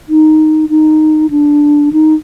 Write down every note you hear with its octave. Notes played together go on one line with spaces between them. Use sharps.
D#4
D#4
D4
D#4